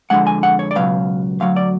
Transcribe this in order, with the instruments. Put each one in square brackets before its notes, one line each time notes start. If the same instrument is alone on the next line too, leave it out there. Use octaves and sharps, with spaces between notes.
[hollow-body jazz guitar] F2 D3 G#3 F#5
G#5
F#5
C#5
D5
C#2 B2 F#3 F5
D2 D3 F#3 F5
D5